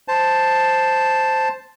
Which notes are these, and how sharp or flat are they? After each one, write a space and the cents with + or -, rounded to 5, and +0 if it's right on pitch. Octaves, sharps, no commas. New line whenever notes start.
C5 +0 A5 +0